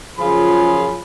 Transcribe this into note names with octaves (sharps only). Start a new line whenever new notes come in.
F#2 C#3 F3 F4 G#4 B5